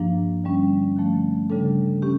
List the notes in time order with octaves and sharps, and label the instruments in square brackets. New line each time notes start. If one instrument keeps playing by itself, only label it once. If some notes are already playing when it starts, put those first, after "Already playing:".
Already playing: [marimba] G2 F3 A#3 D4
D3 G3 C#4
D3 F3 A3
C#3 G3 D4 A4
C#4 G4